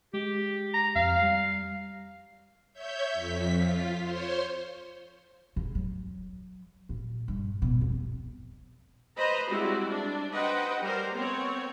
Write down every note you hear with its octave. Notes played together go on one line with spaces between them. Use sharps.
G#3 G4
A#5
F2 F5
G3
C#5 E5 G6
F2 B6
F4
C5 C#5 C6
C#3
F#3
A#2
G2
B2
F2
B4 C5 D#5 A#5 B5
G3 G#3 C4 E4 F#4
D4
B4 C5 D#5 F#5 G5
G3 A#4 C5 A#5
B3 C4 C#5